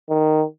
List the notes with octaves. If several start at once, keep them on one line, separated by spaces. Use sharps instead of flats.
D#3